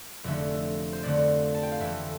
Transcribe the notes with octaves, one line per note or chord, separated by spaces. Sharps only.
F1 F2 D3 A3 E5
C5
F1 F2 D3 A3 D5
A5
G5
F5
F2 E3 A3 E5